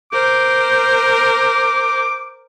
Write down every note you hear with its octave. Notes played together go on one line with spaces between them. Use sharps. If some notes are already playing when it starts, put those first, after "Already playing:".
A#4 C5 D6